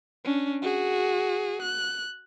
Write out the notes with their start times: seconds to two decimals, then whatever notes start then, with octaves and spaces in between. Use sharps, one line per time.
0.25 C#4 D4
0.62 F#4 G#4
1.62 F#6